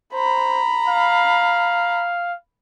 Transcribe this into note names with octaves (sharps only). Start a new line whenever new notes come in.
C5 A#5 B5
F5